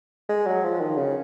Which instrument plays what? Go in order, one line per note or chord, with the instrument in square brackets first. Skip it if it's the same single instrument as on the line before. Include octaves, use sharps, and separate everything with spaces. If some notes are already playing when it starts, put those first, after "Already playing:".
[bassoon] G#3
F#3
F3
D#3
C#3